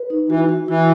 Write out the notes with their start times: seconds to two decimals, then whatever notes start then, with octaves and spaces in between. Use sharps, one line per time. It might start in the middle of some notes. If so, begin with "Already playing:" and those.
Already playing: B4
0.10 D#4
0.29 E3 F#4
0.49 F#4
0.68 E3 E4